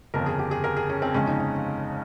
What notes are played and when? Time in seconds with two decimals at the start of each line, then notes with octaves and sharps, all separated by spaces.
0.14 G1 F2 C#3 A#4
0.26 G#4
0.39 G4
0.51 G#4
0.64 A#4
0.76 G#4
0.89 C#4
1.02 C4
1.14 G1 F2 C#3 G#3 C#4
1.27 D#4
1.40 D#4